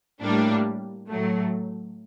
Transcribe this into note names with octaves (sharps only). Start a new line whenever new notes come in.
A2 G3 A#3 D4
A2 F#3 A3